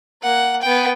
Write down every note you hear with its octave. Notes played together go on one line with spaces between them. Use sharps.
A#3 F#5
B3 G5